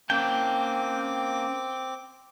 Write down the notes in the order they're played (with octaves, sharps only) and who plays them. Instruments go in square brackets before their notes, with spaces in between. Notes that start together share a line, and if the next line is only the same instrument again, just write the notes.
[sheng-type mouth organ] A#3 [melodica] C4 D6 [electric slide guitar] C#4 A5 [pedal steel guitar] G5